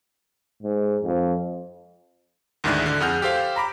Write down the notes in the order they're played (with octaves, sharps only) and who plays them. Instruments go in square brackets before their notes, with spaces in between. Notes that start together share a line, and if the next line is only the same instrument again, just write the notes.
[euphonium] G#2
F2
[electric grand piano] D2 G#2 D#3 D4 E4 F#6
D3
F2 G#4 F#5 F6 G6
G4 A4 C5 F5
A#5 B5 D6